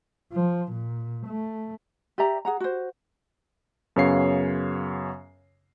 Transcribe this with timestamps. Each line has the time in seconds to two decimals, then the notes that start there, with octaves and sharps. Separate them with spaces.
0.32 F3
0.72 A#2
1.27 A3
2.18 G4 D5 E5 A#5
2.45 G#4 F#5 A#5
2.60 F#4 C5
3.96 F#2 C#3 B3 C#5 F5 C7